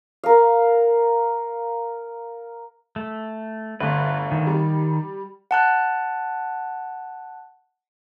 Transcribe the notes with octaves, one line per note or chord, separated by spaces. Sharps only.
A#4 F5
A3
G1 D2 B4
D#3
G3
F#5 A5 F#6